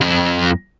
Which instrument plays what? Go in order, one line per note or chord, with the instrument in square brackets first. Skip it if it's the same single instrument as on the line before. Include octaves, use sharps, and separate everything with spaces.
[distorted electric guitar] F2